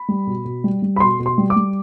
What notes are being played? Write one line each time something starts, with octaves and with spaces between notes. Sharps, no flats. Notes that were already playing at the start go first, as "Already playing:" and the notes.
Already playing: B5
G3
B2
B2
G3
G3
B5
B2 C6
B2
C6
G3
D6
G3